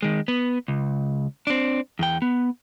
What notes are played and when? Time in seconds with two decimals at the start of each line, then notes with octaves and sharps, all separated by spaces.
0.02 D#3 G#3
0.28 B3
0.68 C#2
1.47 C4 D4
1.99 E2 G5
2.22 B3